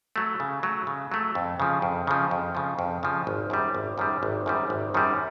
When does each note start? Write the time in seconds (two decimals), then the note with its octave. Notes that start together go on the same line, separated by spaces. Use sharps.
0.16 F#3 A3
0.40 C#3
0.63 F#3 A3
0.87 C#3
1.11 F#3 A3
1.35 F2
1.60 C#3 F3
1.82 F2
2.07 C#3 F3
2.31 F2
2.55 C#3 F3
2.79 F2
3.03 C#3 F3
3.27 G#1
3.50 F#2 D#3 G3
3.75 G#1
3.98 F#2 D#3 G3
4.23 G#1
4.46 F#2 D#3 G3
4.70 G#1
4.94 F#2 D#3 G3